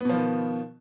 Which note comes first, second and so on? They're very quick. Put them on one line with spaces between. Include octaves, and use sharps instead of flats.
B3 B2 F3 D#3